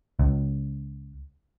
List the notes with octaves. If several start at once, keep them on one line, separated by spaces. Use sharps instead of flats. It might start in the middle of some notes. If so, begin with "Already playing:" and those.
C#2